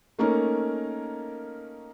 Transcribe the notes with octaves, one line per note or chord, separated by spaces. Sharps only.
A3 A#3 C#4 D#4 A#4